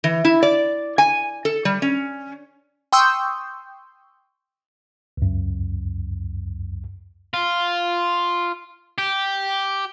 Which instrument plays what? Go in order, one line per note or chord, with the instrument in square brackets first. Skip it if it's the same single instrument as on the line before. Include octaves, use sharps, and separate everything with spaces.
[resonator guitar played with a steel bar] E3
E4
D5
G#5
A4
G3
C#4
[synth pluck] G5 C6 C#6 D#6 E6 G6
[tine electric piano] C#2 F#2
[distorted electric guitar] F4
G4